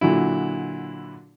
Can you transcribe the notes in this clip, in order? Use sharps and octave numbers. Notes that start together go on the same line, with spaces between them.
A#2 D3 F#3 E4